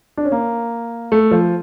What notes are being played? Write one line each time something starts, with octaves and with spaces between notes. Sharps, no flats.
D4
C#4
A#3
A3
F3